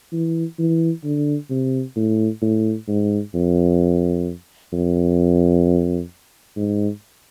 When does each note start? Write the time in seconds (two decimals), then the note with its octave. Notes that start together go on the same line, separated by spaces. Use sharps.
0.13 E3
0.59 E3
1.04 D3
1.50 C3
1.96 A2
2.42 A2
2.88 G#2
3.34 F2
4.73 F2
6.56 G#2